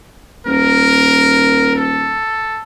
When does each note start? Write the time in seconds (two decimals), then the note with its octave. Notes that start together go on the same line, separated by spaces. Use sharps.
0.46 D#1 A#4
1.76 A4